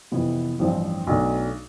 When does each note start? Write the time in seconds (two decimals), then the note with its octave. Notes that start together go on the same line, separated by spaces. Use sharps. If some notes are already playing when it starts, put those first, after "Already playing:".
0.11 F2 C3 E3 B3
0.59 A1 G2 F3 C4
1.07 B1 B2 A3 D4